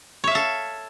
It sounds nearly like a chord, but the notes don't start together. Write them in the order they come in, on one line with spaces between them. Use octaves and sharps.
C#5 E5 F5 A4